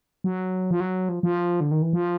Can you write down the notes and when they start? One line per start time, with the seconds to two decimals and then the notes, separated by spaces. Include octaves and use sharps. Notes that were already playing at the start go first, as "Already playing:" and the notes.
0.24 F#3
0.71 F3
0.80 F#3
1.09 F3
1.23 F3
1.60 D3
1.71 D#3
1.82 E3
1.93 F3